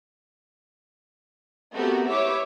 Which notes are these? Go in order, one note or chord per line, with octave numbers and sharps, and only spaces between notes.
A3 B3 C4 F#4 G4 A#4
E4 G4 B4 C#5 E5 D6